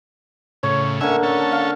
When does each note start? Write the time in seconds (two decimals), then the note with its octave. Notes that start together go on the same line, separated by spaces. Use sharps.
0.63 A2 C#3 C#5
1.01 D3 A#3 C#4 E5 G#5
1.23 C#4 A4
1.52 F5